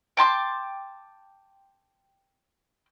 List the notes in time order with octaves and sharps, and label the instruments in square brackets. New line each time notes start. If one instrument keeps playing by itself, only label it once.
[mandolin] G5 A5 C6 D6